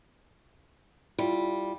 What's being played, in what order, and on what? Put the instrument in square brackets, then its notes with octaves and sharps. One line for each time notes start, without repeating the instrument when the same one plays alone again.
[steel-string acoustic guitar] G3 [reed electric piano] E4 F4